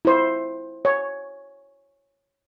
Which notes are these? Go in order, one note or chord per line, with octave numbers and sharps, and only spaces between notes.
E4 C5
C#5